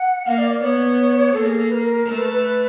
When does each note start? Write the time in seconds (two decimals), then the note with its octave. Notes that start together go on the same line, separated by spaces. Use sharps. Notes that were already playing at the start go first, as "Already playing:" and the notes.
Already playing: F#5
0.26 A#3 F5
0.38 D5
0.51 D5
0.62 B3 C#5
1.34 A#3 A4
1.46 G#4
1.58 A4
1.70 B4
1.74 A#4
2.06 A3 A#4
2.18 B4
2.30 B4